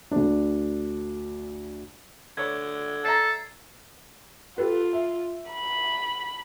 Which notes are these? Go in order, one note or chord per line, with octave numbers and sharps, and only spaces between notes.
D2 D4
D3 B4 C#5 D5 G#6
A4 D5 E5 A#5 A6 C7
F4 G4 A4 B4
E5
B5